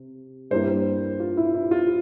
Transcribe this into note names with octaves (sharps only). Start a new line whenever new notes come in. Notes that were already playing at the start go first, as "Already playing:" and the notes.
Already playing: C3
G2 G3 A#3 E4 C5
F4
E4
E4
F4